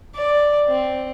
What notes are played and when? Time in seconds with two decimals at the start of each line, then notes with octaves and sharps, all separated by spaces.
0.15 D5
0.68 C4